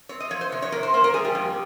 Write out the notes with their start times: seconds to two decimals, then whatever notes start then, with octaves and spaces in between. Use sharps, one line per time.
0.09 C4 C#5
0.20 D#5
0.31 F3 C#5
0.41 C5
0.52 C3 C#5
0.62 C#5
0.72 C3 A#4
0.83 C5
0.94 A#3 C5
1.04 A#4
1.14 G3 G#4
1.25 G4
1.35 F2